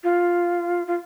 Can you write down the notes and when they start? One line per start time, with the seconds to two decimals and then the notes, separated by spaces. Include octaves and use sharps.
0.04 F4
0.87 F4